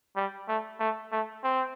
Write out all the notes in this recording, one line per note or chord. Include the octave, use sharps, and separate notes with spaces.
G3
A3
A3
A3
C4